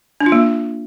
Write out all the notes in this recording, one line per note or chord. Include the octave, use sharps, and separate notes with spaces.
D4
F4
A#3